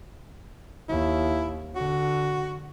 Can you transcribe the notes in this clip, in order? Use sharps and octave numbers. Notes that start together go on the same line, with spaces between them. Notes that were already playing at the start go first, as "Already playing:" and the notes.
D#2 E4
D3 F#4